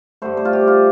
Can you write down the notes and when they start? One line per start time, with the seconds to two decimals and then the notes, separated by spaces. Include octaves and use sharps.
0.22 G2 D3 A3 C5
0.37 C5
0.45 F4
0.53 G4
0.68 F4